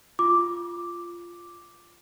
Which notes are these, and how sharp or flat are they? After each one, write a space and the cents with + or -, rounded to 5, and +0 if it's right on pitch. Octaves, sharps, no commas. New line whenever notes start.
F4 -10 D6 +0